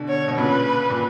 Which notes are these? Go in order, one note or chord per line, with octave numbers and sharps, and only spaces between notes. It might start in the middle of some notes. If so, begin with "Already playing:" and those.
Already playing: B2 D3
C#5
B2
A#2 C#3 B4
A#2